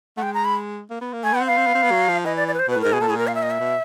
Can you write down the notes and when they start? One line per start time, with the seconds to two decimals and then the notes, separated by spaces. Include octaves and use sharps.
0.17 A3 F#5
0.23 G#3 G5
0.34 A#5
0.45 B5
0.90 A#3
1.01 B3
1.13 A#3
1.24 A3 G#5
1.33 B3 F#5
1.41 C4
1.46 B3 F5
1.57 C4
1.67 B3
1.75 C4
1.83 B3
1.91 F#3
2.08 F3
2.25 E3 D#5
2.36 D5
2.48 D5
2.54 B4
2.59 C5
2.68 B2 B4
2.76 A2
2.81 G#2 A#4
2.93 B2 G#4
3.00 A#2 A4
3.08 A2
3.10 G#4
3.15 A#2 A#4
3.27 F5
3.35 E5
3.43 D#5
3.51 E5
3.60 B2